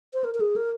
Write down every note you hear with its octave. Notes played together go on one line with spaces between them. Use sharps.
C5
A#4
A#4
G#4
A#4